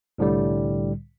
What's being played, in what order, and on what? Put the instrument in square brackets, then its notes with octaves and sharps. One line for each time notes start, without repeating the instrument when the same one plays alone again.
[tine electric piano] C2 A2 D3 G3